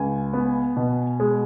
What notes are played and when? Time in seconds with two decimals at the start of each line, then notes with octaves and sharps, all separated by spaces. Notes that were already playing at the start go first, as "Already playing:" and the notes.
Already playing: C#2 G#5
0.33 B3
0.77 B2
1.20 G#3